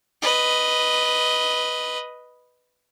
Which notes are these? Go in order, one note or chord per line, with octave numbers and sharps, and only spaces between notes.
B4 D#5